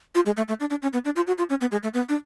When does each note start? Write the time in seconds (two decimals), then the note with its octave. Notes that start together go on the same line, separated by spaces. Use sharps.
0.15 F4
0.26 G#3
0.37 A3
0.48 A3
0.60 D4
0.70 D4
0.82 C#4
0.93 B3
1.05 D4
1.16 F4
1.27 F#4
1.38 F4
1.50 C#4
1.61 B3
1.72 G#3
1.83 A3
1.94 B3
2.09 D4